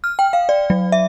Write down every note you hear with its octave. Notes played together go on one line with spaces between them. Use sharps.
F6
G5
F5
D5
F#3
E5